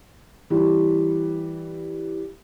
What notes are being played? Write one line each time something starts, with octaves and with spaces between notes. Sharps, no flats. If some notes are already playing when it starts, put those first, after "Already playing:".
E3 G3